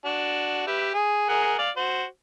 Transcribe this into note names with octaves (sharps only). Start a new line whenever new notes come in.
D4 F#4
G4 B4 E5
G#4
G#4 A#4 F#5
D5 F5
F#4 C5